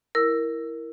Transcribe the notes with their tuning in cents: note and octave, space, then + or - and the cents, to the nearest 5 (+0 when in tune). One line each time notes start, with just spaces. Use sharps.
E4 +0 A#4 +0 E6 +10